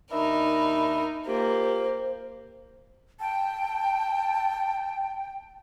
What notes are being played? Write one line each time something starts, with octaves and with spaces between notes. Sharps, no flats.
D#2 D4 D#4 A#4 E5 B5
A#3 F4 G4 C5
G5 A5